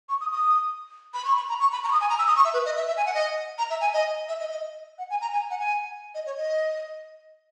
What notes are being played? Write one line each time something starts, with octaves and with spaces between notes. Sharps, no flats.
C#6
D#6
D#6
B5
C#6
B5
A#5
C#6
B5
A#5
C#6
D#6
G#5
A#5
E6
D#6
C#6
E5
B4
D#5
E5
E5
G#5
F#5
D#5
A#5
E5
G#5
D#5
E5
D#5
D#5
F#5
G#5
A#5
G#5
F#5
G#5
D#5
C#5
D#5